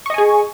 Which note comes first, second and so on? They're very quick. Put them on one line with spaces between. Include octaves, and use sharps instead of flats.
C#6 D#5 G#5 G#4